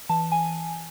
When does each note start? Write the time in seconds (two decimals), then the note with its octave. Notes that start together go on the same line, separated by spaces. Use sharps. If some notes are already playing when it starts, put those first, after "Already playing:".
0.09 E3 A5
0.32 G#5